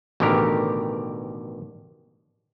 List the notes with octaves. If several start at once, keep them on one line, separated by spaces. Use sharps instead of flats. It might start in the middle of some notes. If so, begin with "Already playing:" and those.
A1 B2 D3 D#3 G4 A#4